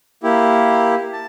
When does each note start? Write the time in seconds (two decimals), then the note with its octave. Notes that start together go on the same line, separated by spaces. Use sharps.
0.23 A#3 E4 G4
1.13 A5